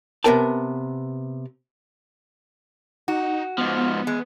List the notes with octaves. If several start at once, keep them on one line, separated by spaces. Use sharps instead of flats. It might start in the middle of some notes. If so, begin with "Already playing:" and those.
C3 A3 B3 A#4 G5 A5
D#4 F#4
G#2 F3 B3
E2 G#3